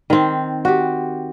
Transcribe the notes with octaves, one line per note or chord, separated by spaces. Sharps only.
D#3 C4
F#4 G4